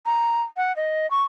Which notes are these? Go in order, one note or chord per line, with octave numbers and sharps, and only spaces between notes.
A#5
F#5
D#5
C#6